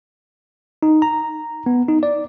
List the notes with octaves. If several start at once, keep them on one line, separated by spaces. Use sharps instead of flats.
D#4
A#5
B3
D#4
D5